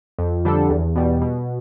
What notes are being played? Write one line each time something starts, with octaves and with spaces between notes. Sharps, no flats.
F2
D3 G3 D4 A4
E2
B2 G3
B2